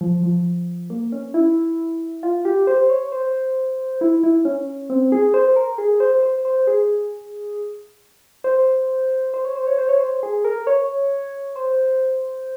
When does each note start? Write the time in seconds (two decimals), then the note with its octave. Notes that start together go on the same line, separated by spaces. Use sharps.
0.01 F3
0.23 F3
0.90 A#3
1.12 C#4
1.34 E4
2.23 F4
2.45 G4
2.67 C5
2.90 C#5
3.12 C5
4.01 E4
4.23 E4
4.45 C#4
4.90 C4
5.12 G#4
5.34 C5
5.56 A#4
5.78 G#4
6.00 C5
6.23 C5
6.45 C5
6.67 G#4
8.44 C5
9.34 C5
9.45 C#5
9.56 C5
9.67 C#5
9.78 C5
9.89 C#5
10.00 C5
10.23 G#4
10.45 A#4
10.67 C#5
11.56 C5